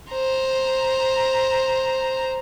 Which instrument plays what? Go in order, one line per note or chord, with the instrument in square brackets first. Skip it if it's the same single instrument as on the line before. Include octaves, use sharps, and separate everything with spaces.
[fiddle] C5 A#5